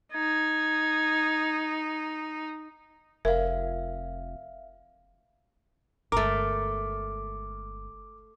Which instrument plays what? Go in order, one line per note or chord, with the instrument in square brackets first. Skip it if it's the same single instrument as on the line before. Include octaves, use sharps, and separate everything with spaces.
[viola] D#4 [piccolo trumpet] G#6
[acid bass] F1 [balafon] A#4 [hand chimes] E5 F5
[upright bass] G1 G#3 [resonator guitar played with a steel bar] A3 A#4 [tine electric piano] D6